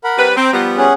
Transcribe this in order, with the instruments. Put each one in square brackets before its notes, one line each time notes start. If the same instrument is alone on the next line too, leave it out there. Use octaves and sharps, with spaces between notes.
[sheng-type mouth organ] A#4 F#5 B5
[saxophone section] G3 C4 B4
[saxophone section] C4 [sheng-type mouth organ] A#5 C6
[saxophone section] F3 G3 B3
[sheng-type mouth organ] C#4 G#4 F#5